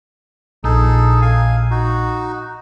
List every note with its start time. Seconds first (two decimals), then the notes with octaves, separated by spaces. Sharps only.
0.64 A#1 D#4 G#4 A4
1.22 F5 G#5
1.71 D#4 F#4